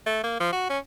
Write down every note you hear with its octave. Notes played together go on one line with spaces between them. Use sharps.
A3
A#3
F3
F#4
C#4